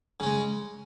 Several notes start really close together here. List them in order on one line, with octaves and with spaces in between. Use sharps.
C#3 C#4 G#3